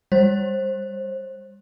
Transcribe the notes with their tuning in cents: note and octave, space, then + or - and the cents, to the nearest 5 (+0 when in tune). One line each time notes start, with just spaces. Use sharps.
G3 +30 C5 +25